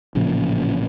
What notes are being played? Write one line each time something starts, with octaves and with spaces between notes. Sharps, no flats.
A1 A#2 C#3 F3